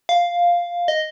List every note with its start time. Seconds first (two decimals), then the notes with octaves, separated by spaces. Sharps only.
0.09 F5
0.88 D#5